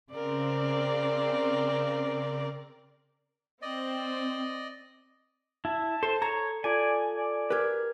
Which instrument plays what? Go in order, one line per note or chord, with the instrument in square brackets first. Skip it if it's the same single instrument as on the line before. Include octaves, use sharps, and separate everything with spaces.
[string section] C#3 C4 [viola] A#4 D5
[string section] C4 [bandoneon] D5 D#5
[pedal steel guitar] E4 [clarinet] A5
[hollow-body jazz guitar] A4 [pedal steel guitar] C5
[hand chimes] A4 [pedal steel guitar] C#5 [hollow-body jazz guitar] A#5
[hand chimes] F4 A4 G#6 [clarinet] D5 [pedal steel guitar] G#5
[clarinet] D5
[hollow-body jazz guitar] G4 B4 [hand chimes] A#4 F6 G#6